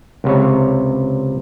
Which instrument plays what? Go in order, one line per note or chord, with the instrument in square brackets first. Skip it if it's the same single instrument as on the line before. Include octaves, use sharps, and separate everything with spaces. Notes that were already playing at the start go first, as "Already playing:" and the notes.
[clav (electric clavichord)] C#2 C3 C#5